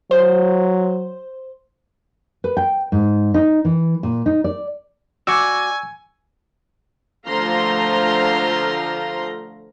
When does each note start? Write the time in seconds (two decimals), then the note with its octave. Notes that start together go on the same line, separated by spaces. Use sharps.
0.11 F#3 C5
2.44 B4
2.57 G5
2.92 G#2
3.34 D#4
3.65 E3
4.03 A#2
4.26 D#4
4.44 D5
5.27 F#4 D5 G#5 C#6 E6
7.27 D3 F3 A3 F5 A#5 C6